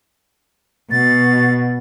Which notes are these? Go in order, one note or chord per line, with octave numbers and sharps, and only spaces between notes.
B2 A6